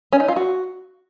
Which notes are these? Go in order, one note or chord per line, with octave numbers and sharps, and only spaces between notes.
C#4
D#4
F4
F#4